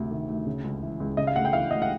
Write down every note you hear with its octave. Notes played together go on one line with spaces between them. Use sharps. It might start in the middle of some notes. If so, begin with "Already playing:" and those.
Already playing: D2 C3
D#3
D2
C#3
C#2
E3
C#2
C#3 D#5
F5
D2 F#5
G5
E3 F5
D2 D#5
F#5